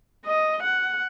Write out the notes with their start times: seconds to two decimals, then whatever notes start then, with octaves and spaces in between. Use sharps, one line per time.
0.25 D#5
0.64 F#5